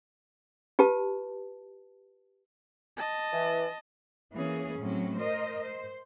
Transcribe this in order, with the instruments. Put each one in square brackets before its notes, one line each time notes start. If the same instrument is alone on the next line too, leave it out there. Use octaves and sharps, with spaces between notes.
[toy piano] F4 G4 B4 A5
[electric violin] D#5 A5
[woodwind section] E3
[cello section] E3 A#3 C#4 G#4
A2 F#3 C4 C#4
A#4 C5 D#5
C5